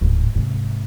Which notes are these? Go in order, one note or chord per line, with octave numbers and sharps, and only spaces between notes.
D1 G#2
G#2 C3